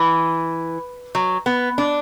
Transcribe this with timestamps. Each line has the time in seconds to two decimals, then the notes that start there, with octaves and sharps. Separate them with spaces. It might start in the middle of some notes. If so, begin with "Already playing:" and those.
Already playing: E3
1.15 F#3
1.46 B3
1.78 D4